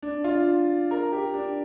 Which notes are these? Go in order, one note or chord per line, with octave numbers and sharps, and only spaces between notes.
D4
F4
A#4
G4
D4